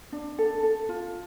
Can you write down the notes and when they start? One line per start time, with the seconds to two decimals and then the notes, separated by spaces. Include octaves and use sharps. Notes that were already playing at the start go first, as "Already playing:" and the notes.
0.12 D4
0.38 A4
0.63 A4
0.89 F4